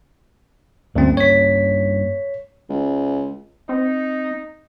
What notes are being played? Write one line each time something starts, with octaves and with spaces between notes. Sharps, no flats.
D2 G2 A#3 C4 C#4
C#5 B6
C#2
C4 D#4